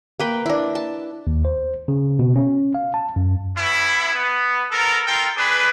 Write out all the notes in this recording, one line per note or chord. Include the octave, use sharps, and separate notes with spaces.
A#3 B4 G5
D4 E4
A5
D#2
C5
C#3
B2
C#4
F5
A5
F#2
B3 C#4 E4
B3
B3 A4 A#4
F4 A4 A#4 G5
D4 G#4 B4